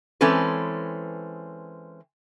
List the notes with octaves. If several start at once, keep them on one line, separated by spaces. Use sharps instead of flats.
E3 G#3 C4 C#4 A4 B4